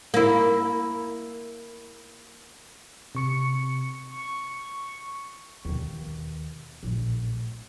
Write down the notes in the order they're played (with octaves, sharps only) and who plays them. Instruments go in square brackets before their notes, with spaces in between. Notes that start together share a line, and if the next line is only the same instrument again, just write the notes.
[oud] A#3 E4
[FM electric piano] C3 C#6 C#7
[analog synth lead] C#6
[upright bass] D#2 B2
A#1 A2